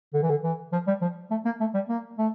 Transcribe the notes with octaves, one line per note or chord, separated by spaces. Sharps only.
D3
E3
D3
E3
F3
G3
F3
A3
A#3
A3
G3
A#3
A3